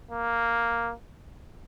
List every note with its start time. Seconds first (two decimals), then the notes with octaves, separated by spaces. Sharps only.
0.11 A#3